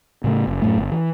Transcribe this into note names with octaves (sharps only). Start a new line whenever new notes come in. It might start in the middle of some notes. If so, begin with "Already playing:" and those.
A2 C#3 A3
F#1
F#2 A2 A3
G1
E3